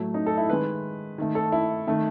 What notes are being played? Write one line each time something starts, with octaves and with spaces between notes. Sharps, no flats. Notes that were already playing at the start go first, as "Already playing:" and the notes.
Already playing: A2 F#3 A3
D#4
A4
E4
D#3 G#3 B4
D#3 A3
A4
E4
D#3 A3